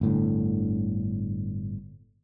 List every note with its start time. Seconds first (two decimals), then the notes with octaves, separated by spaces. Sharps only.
0.01 G1 A2 D3